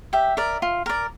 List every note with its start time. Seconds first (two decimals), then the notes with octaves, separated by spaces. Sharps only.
0.13 G4 E5
0.37 A#4 D5
0.62 F4
0.86 A#4 D5